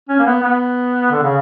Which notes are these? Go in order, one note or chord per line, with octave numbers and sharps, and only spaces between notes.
C#4
A#3
B3
B3
D3
C#3